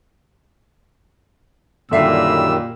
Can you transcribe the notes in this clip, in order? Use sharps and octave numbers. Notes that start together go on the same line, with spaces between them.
F#2 A#2 D3 D#3 G3 E5 E6 C7